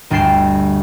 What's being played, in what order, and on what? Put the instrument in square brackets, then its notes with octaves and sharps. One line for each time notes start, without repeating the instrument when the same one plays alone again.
[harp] G1 D2 G5 A6 C7 E7